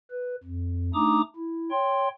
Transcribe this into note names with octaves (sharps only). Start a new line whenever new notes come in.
B4
F2
A3 D4 D#4 A#5 D6 D#6
E4
C#5 G5 C6